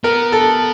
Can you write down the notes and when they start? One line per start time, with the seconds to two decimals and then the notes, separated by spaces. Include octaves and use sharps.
0.04 B3 A#4
0.32 A4